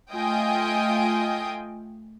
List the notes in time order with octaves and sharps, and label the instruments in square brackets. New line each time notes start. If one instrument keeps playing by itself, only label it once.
[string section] A3 F4 D#5 G5 G#5